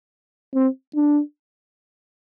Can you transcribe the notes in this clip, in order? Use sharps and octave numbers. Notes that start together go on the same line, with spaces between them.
C4
D4